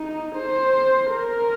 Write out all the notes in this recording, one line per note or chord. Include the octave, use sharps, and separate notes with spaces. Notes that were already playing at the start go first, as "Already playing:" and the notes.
Already playing: D#4
C5
A#4